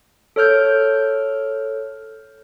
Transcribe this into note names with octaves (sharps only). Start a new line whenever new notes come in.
A4 C#5 F6 G6